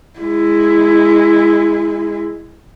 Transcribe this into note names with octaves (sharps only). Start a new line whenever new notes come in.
G#3 E4